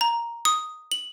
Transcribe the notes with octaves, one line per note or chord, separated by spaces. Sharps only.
A#5
D#6
F#7